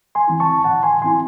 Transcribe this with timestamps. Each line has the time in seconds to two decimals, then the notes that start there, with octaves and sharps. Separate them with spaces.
0.15 G#5 C6
0.28 E3 C4 E4
0.40 A5 C#6
0.64 A2 F#5 A5
0.83 G#5 C6
1.02 E3 C4 E4 G#5 C6